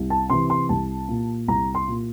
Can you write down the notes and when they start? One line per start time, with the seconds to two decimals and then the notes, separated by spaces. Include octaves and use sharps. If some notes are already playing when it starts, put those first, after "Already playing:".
Already playing: C2
0.10 A5
0.30 C3 E3 C6
0.50 C6
0.69 C2 A5
1.09 A#2
1.48 C2 A#5
1.75 C6
1.88 A#2